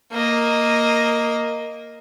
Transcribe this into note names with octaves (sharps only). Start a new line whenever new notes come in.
A#3 D#5